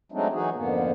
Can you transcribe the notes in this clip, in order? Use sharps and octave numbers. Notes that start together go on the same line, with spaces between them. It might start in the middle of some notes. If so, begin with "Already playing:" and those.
F#3 G#3 A3 C4 D4 D#4
E3 F#3 D#4 F#4 G#4
F2 G#2 D3 A#3 B3